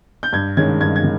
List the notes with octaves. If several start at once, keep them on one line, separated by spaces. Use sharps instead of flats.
G6
G2 G#6
D#3 G#3 C#4 G#6
G2 G#6
G#6
D#3